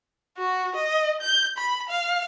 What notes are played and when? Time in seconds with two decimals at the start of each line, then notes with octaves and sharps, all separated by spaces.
0.37 F#4
0.75 D#5
1.21 G6
1.57 B5
1.89 F5